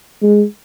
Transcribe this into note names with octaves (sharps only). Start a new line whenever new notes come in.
G#3